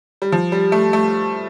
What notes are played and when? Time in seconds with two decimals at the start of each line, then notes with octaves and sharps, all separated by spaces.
0.22 G3
0.32 F3
0.52 G3
0.72 A3
0.93 A3